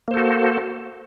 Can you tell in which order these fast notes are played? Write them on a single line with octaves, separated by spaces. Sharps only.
A#3 C5 A4 F#4